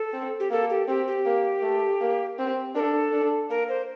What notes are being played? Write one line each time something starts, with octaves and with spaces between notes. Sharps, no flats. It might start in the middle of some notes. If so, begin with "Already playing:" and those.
Already playing: A4
C4
G4
A#3 A4
G4
C4 G4
G4
A#3
A3
A#3
C4
D4 A#4
A4
D4
A#3 A#4
C5